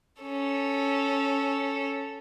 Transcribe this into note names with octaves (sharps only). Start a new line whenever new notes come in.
C#4 A4